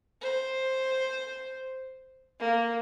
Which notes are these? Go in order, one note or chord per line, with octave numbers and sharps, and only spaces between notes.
C5
A#3